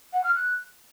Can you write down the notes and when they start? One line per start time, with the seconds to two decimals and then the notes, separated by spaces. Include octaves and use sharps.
0.13 F#5
0.24 F6
0.35 F#6